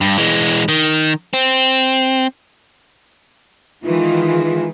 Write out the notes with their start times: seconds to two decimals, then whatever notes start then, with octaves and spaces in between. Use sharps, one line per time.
0.01 G2
0.18 E3 G#3
0.68 D#3
1.33 C4
3.83 D#3 E3 G#3 F4